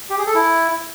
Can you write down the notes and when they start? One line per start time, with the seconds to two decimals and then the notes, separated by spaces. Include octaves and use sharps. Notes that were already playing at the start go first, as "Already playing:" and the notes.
0.10 G4
0.18 G#4
0.26 A4
0.34 E4